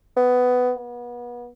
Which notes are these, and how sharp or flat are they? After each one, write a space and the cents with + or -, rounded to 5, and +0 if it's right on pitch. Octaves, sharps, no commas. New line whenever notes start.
B3 +15
B3 -30